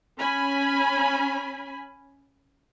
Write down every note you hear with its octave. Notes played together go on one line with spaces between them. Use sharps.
C#4 G#5 B5